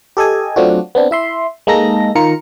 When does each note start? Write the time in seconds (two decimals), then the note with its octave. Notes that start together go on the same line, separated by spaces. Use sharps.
0.17 G4 A4 D#5 G#5
0.56 F#3 A3 C4 D4 F4 F#4
0.95 B3 C4 D4
1.11 E4 E5 C6
1.67 G#3 A#3 D#4 A4 A#6
2.15 D#3 F4 A#4 A#5 C#7